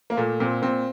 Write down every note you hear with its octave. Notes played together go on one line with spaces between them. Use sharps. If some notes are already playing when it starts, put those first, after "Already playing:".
A#3
A#2 A3
A#2 C4
A#2 C4